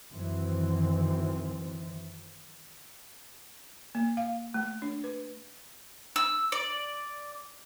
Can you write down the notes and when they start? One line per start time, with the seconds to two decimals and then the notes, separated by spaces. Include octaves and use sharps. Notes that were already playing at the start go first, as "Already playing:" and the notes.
0.11 F#2 D#3 E3 C4
3.95 A#3
4.17 F5
4.54 A3
4.82 D4
5.04 B4
6.16 E6
6.52 D5